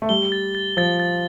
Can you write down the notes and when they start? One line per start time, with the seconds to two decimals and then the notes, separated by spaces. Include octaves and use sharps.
0.02 A3
0.09 G3 G7
0.32 A6
0.55 A6
0.77 F3 A6
1.00 A6